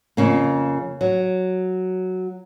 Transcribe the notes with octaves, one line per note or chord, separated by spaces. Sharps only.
F2 C#3 A#3
F#3